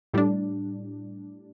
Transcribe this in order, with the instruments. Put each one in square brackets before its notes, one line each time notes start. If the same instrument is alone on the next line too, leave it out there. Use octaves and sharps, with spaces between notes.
[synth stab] A2 G3 D4